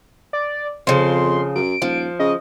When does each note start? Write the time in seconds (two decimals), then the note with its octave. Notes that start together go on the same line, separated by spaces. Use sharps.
0.33 D5
0.87 F2 C#3 F3 C6
1.56 F#2 D7
1.82 D#1 F3
2.20 C#3 D#5